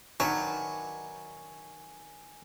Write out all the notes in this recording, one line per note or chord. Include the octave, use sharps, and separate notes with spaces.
D#3 F#3 D4 B4 C#5 G#5